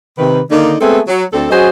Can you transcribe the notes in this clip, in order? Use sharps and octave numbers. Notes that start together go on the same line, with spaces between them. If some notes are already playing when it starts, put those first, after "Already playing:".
C3 D#3 B4
D3 D#3 A#3 D#4
G#3 A3 B3 C4 G#4 A4
F#3
D2 C4 D4 A4
F#3 C#4 F#4 G#4 C5 D#5